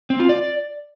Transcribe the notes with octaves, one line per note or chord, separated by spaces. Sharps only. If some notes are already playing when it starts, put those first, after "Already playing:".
C4
F4
D5